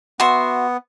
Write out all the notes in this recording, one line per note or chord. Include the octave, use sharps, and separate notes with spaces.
B3 F#4 E5 C6